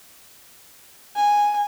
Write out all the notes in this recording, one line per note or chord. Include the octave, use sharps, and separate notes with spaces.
G#5